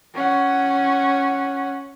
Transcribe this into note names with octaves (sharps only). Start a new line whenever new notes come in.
C#4 F#5